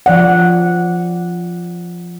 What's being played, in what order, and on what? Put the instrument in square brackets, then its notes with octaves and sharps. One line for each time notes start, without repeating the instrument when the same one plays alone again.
[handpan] F3 D5 F#5